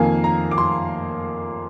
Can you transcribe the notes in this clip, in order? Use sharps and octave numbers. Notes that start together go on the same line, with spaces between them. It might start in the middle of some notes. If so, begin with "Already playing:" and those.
Already playing: F2 D#3 A#3 G#5
A#5
D6
C6